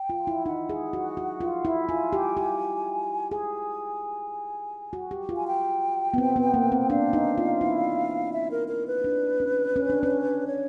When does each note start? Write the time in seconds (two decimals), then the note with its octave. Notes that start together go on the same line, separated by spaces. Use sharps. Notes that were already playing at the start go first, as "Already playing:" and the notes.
Already playing: G5
0.10 F4
0.27 E4
0.46 D#4 F#5
0.69 G#4
0.93 F#4
1.17 F#4
1.41 F4
1.65 E4
1.88 F4 G#5
2.13 G4
2.37 G4
3.31 G#4 G#5
4.93 F#4
5.11 G4
5.29 F4
5.36 G#5
5.47 G5
6.14 B3
6.18 C4
6.36 B3
6.54 A#3
6.72 C4
6.90 D4 F5
7.13 D#4
7.38 F4
7.61 E4
8.33 E5
8.51 A#4
8.68 A#4
8.87 B4
9.04 D4
9.40 C#4
9.76 C#4
9.90 D4
10.03 C#4
10.47 C#5